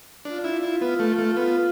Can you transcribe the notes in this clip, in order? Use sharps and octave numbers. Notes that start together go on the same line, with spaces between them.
D4 F4
E4
E4
B3
A3
A3
B3 F4